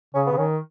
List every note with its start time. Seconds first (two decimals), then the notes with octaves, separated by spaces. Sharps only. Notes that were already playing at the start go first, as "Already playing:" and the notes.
0.14 C#3 C#4
0.26 B3
0.32 C#3
0.37 D#3 C#4